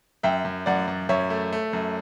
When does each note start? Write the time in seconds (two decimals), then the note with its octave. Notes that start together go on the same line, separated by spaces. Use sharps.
0.23 F#2 E5 G5
0.45 F#2
0.66 F#2 D5 F#5
0.88 F#2
1.09 F#2 C#5 E5
1.30 A3
1.53 A3
1.73 F#2